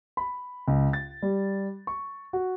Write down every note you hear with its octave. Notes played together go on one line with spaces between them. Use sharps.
B5
C#2
A6
G3
C#6
F#4